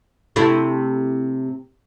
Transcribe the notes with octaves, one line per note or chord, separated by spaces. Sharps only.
C3 A3 E4